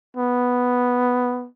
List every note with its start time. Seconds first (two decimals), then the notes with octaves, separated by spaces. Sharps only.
0.17 B3